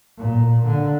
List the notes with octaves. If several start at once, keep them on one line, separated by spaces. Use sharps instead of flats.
A#2
D3